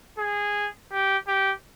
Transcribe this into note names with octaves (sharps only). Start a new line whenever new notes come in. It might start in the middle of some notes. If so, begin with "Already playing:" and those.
G#4
G4
G4